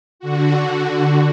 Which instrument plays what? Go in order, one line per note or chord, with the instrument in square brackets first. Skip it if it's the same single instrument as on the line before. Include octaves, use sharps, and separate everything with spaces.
[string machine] D3 F#4